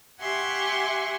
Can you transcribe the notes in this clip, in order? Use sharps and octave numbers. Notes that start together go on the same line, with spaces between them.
G4 E5 F#5 G#5 C6 C#6